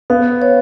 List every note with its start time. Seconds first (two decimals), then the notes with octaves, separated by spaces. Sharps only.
0.10 B3 F5
0.42 C#5